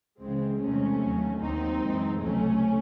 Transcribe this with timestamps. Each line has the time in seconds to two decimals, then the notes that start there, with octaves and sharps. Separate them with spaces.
0.21 C#2 C#3 E3 G#3 C4
0.60 E2 C3 D#3 G#3 A3 C#4
1.00 D#2 D#3 F#3
1.40 D#2 D#3 F#3 C4 D#4
1.80 F#2 E3 G#3
2.20 C#2 C3 F#3 A3 C#4